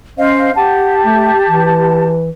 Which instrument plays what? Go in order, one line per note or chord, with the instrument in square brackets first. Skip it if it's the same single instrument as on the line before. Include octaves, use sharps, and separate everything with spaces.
[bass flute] C#4 [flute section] C5 D#5 F5
[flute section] G4 A5 [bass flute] F#5
[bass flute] A3
E3